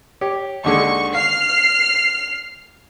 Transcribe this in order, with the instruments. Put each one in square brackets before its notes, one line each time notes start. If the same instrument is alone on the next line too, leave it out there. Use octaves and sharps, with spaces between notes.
[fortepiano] G4 C#5
[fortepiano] D#2 D3 G#3 [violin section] C#6
[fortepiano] F5 [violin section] F6 C7